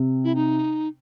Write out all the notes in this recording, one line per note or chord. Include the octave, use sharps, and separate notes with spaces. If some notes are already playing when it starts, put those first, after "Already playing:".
Already playing: C3
E4
D#4